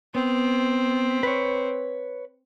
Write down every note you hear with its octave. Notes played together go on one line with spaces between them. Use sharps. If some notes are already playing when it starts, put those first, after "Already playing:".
B3 C4
B4 C#5